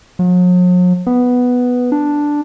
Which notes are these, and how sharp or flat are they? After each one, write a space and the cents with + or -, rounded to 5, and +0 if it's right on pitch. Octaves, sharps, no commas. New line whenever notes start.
F#3 -45
B3 +0
D4 +0